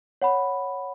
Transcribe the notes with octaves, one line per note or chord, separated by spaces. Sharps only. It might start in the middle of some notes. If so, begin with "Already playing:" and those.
C#5 F#5 B5